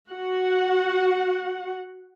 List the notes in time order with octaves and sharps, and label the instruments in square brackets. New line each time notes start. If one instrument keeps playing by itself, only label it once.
[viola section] F#4 F#5